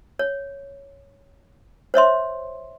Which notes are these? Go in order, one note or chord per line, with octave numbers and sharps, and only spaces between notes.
C#5
C5 C#5 E5 C6